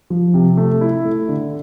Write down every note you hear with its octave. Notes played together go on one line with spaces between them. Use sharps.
F3
C3
A3
E4
A3
D3